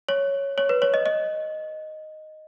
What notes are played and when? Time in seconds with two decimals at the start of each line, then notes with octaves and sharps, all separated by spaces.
0.09 C#5
0.58 C#5
0.69 B4
0.82 C#5
0.94 D#5
1.06 D#5